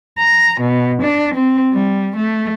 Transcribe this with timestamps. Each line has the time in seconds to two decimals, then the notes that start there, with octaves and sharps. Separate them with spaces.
0.18 A#5
0.59 B2
1.02 D4
1.34 C4
1.73 G3
2.17 A3